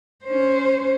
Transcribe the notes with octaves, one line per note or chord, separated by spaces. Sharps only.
C#4 C5